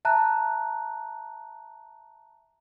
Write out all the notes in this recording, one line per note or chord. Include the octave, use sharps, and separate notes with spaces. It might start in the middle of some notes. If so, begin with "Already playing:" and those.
E5 A5 A#5 F#6